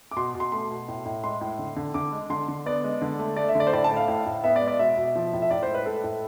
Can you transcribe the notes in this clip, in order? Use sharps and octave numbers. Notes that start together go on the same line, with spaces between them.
D6
B2 C6
B2
C6
A3 C6
B2
A2
A2
G#3 C6
A2
D3
D3
D3 D6
G#3
D3 C6
D3
B3 D5
G#3
D3
A3
A3 D5
E5
D3
D5
C5
A2 D5
A5
A3
F5
A2
A2
B3 E5
D5
G#3
D5
B2 E5
B2
F3
A2
E5
A2 D5
C5
G#3
B4
A2 A4
A2